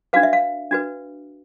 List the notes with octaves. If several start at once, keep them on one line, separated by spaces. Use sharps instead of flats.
D4 F#4 B4 F5
E5
F5
D4 F#4 B4